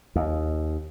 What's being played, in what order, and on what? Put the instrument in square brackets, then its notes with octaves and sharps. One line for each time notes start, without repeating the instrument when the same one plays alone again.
[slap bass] D#2